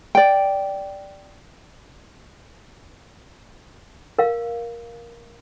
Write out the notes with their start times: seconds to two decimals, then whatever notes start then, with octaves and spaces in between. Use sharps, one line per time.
0.15 D5 G5
4.19 A#4 F5